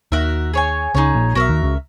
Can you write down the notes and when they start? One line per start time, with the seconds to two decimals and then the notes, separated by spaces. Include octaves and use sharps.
0.12 D#2 D#3 F#4 A#4 E5
0.54 G#4 C#5 G#5
0.94 C#2 C#3 D#4 G#4 C#5
1.15 A#1 A#2
1.35 B1 B2 F#4 A#4 E5
1.49 D#2 D#3
1.63 C#2 C#3